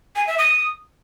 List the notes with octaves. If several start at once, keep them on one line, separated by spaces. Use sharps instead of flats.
G#5
E5
D#6